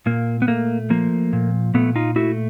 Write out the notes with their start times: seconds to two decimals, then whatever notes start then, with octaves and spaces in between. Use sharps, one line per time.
0.06 A#2 A#3
0.42 B3
0.48 A3 A#3
0.90 F3 A#3
1.33 A#2
1.74 A#2 A3 B3
1.96 D#4 F4
2.16 A3 E4 F#4